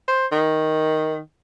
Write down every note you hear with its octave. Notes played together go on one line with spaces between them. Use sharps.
C5
D#3